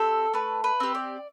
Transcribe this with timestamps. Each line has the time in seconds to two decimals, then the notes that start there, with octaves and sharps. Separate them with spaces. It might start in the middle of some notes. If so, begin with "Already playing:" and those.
Already playing: C4 G4 A4
0.34 A3 B4
0.64 B4
0.80 C4 G4
0.95 D5